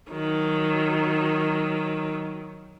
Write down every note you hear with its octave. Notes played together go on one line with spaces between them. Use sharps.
D#3 F#3